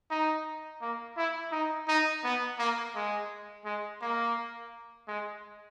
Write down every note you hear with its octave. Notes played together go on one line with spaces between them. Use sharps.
D#4
A#3
E4
D#4
D#4
B3
A#3
G#3
G#3
A#3
G#3